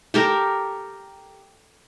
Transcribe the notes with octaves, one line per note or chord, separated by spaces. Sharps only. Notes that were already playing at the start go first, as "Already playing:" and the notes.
G4 A4 A#4